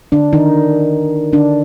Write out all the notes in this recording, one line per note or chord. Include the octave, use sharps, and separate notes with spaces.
D3 D4
D#3 D#4
D3 D4